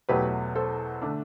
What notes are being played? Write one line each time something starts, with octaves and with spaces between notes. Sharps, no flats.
E2 B2 F#3 A3 G4 B4
A4 C5
D3 A3 D4